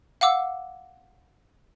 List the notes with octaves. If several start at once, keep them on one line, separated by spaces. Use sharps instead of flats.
F5 F#5 D6 E6